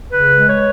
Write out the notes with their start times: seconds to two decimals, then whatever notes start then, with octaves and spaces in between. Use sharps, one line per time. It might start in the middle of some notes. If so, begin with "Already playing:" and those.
0.10 C#3 B4
0.35 G#3
0.48 C#5